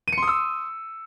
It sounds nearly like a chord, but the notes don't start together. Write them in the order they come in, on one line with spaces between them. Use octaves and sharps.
D#7 C#7 C6 D#6 E6